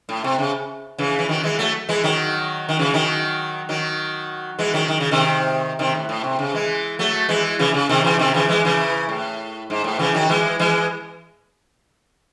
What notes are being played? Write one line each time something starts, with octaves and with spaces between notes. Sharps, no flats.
A2
C3
C#3
C#3 E3
E3
D#3 F#3
E3 G#3
F#3 A3
E3 G#3
D#3 F#3
D#3
C#3 E3
D#3 F#3
D#3 F#3
E3 G#3
D#3 F#3
D#3
C#3
C3 D#3
C3 D#3
A2
A2
C3
C#3
E3 G#3
F#3 A3
E3 G#3
C#3 E3
C#3
C3 D#3
C#3 E3
C3 D#3
C#3 E3
E3 G#3
C#3 E3
A2
G#2
A2
C#3 E3
D#3 F#3
E3 G#3
E3 G#3